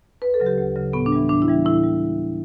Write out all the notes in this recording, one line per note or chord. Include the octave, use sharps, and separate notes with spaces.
D2 B4
A4
C#3 F#3
G4
D2
C#3 F#3
A2 B3
D4
E3 G3
A2 D4
E4
E3 G3
A2 E4
G3